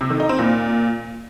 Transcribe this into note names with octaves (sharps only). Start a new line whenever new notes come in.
C3
D#3
D#4
C4
A#2